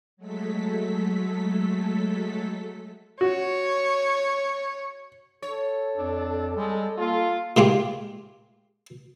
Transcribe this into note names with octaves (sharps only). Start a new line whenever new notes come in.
F#3 G#3 A3 A4 B6
F#4 C#5
A4 C#5
F2 D4
G3 G#3
A#3 F4 A4
A#2 G#3 F4 G4